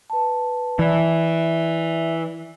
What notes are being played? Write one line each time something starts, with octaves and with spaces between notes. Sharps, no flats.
B4 A5
E3 D5 E5